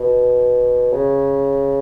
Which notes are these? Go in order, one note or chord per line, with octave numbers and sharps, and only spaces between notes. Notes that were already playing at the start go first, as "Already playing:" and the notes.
Already playing: B2
C#3